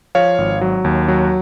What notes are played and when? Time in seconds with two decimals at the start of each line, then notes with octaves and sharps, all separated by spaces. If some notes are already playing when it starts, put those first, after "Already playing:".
0.15 F3 C#5 F5
0.38 G#1
0.61 F#3
0.84 D#2
1.08 F#3